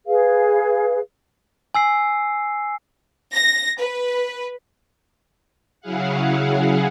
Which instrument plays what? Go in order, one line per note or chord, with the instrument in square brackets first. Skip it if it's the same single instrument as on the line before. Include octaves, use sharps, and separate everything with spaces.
[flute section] G#4 B4 F5
[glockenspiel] G#5 E6 C7
[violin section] A#6
B4
[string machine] C#3 F#3 E4 G#4 F5 F#5